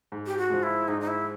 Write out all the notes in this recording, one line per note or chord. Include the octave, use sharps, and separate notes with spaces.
G#2
G4
F#4
F3 G#3
E4
G#2 D#4
D#4
E4